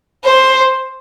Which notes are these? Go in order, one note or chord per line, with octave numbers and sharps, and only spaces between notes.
C5